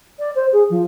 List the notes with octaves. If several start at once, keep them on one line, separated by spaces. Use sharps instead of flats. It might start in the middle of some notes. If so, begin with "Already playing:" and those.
D5
C5
G#4
F3